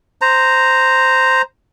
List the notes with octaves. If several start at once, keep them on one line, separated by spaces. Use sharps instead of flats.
C5 A#5